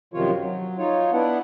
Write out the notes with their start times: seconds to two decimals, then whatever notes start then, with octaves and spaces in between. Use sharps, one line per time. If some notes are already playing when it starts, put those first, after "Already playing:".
0.14 F#2 C3 D#3 F3 F4 C#5
0.40 F#3
0.78 D#4 F4 C#5
1.12 B3 D4 E4 F#5